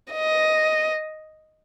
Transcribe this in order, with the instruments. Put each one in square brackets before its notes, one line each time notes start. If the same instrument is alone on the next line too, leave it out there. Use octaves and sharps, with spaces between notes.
[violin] D#5